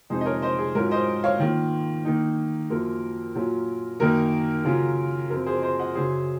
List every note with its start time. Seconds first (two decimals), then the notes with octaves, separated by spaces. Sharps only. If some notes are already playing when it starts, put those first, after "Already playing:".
0.10 F2 C3 F3 G#3 D#4 G#4 C5
0.21 D#5
0.25 A#4 C#5
0.42 C5 D#5
0.58 G#4
0.75 G#2 F#3 C#4 F4 A#4
0.91 C5 D#5
1.24 C#5 F5
1.40 D#3 A#3 F4
2.05 D#3 A#3 D#4
2.70 F#2 F3 A#3 F4 A#4
3.35 A#2 F#3 C#4 F4
3.99 F#2 D#3 A#3 D#4 A#4
4.65 C#3 F#3 C#4 F4
5.30 F#2 F3 C4 F4 A#4
5.46 G#4 C5
5.62 C5 D#5
5.79 D#5 F#5
5.95 F#2 C#3 F#3 C#4 G#4 C5